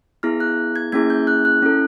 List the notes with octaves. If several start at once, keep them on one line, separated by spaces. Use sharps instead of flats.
B3 E4 G#4 F6
F#6
G#6
A#3 C#4 E4 G#4 G#6
G6
F#6
F#6
C#4 E4 A4